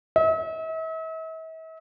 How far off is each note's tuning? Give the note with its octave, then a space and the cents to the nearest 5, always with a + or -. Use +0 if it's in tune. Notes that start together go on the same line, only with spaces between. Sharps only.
E5 -45